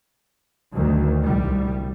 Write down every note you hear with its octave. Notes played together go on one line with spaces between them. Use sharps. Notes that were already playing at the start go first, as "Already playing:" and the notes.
D2 D#3
C2 G3